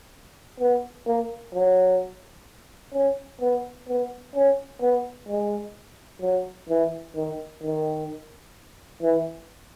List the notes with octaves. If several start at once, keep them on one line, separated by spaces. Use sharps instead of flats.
B3
A#3
F#3
C#4
B3
B3
C#4
B3
G#3
F#3
E3
D#3
D#3
E3